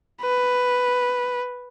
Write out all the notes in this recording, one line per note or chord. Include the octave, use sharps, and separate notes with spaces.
B4